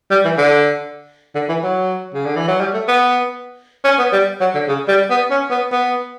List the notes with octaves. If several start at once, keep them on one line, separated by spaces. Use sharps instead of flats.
G3
E3
D3
D3
E3
F#3
C#3
D3
E3
F#3
G3
A3
B3
C#4
B3
G3
F#3
D3
C#3
G3
B3
C#4
B3
B3